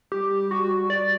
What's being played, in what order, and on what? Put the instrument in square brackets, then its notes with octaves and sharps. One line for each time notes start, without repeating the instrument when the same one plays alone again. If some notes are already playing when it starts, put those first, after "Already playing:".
[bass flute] G3 [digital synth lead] G4
[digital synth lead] F#4
D5